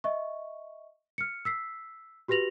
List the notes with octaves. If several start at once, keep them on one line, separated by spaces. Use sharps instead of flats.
D#5 E5 C#6
F6 C#7
E6 B6 C7
F#4 G4 B4 A#6 F7 F#7